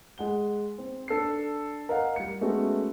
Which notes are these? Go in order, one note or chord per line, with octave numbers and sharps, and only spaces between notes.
G#3 F#5 G7
C4
D4 A4 A5 C7
A#4 D#5 F5 F#5
G3 C#7
G#3 A3 B3 C#4 F#4